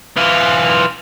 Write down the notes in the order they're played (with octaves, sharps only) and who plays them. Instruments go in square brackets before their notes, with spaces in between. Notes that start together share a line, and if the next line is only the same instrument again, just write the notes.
[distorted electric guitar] E3 F4